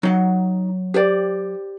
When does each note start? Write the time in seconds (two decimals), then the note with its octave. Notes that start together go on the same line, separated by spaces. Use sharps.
0.03 F#3 D#4 F#5
0.94 G4 C5 D5